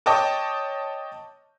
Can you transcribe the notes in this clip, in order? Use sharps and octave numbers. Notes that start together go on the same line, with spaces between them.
C#5 D#5 G5 A5 C#6 D6